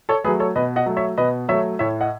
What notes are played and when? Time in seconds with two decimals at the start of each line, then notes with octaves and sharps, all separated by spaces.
0.09 A4 C#5
0.24 A3 G#4 B4
0.28 F#3
0.39 A4 C#5
0.56 B2 B4 D#5
0.76 D#5 F#5
0.86 F#3 A3
0.97 C#5 E5
1.17 B2 B4 D#5
1.48 F#3 A3 C#5 E5
1.79 A2 C#5 E5
2.01 D#5 F#5